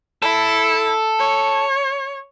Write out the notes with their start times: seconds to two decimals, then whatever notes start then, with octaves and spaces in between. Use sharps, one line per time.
0.22 E4 A4
1.19 C#5